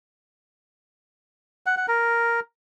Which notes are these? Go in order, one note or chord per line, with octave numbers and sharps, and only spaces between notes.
F#5
F#5
A#4